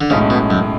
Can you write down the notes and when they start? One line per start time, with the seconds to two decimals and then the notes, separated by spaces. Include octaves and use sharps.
0.01 D3
0.10 B1 A2 C#3 G#3 C#4
0.30 B2
0.50 F#2